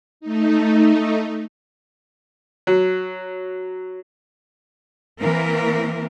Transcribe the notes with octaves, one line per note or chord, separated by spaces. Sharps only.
A3 D#4
F#3
E3 A#3 C4 A#4